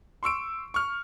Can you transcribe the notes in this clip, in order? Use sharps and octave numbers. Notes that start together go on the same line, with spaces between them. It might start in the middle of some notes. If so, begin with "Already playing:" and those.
C6 C#6 E6 D7
C#6 F6